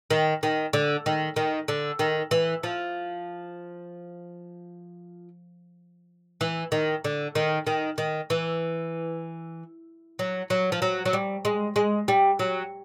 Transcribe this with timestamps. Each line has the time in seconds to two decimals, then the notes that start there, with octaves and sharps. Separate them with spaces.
0.11 D#3
0.43 D#3
0.73 D3
1.06 D#3
1.36 D#3
1.68 D3
1.99 D#3
2.31 E3
2.63 F3
6.41 E3
6.72 D#3
7.04 D3
7.35 D#3
7.67 D#3
7.98 D#3
8.30 E3
10.19 F#3
10.50 F#3
10.72 F3
10.82 F#3
11.05 F#3
11.13 G3
11.45 G#3
11.76 G#3
12.08 G3
12.39 F#3